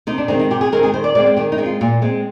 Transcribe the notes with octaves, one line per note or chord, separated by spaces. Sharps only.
C3 D#4
D4
D#3 G#3 C4 D#4
D#4
C3 G4
G#4
D#3 G#3 C4 A#4
G#4
D#3 C5
D5
G#3 C4 D5
C5
D#3 G4
D#4
G#3 C4
F4
A#2
G#3 C4